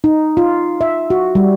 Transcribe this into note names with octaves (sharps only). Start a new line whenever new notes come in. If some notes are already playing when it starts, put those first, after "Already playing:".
D#4
F4
E5
F#4
G3